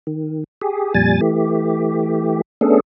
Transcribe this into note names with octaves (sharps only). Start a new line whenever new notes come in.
D#3
G4 G#4
F2 A#2 G3 G#5 A6
E3 A3 G4
A3 B3 C#4 D4 G#4 A4